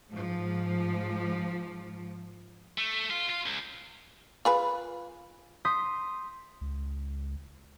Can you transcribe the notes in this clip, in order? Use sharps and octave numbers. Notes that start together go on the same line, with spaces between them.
G#2 F3
A3
F4
F4
C#2
F4 G#4 B4
C6 D#6 G6 B6
C#2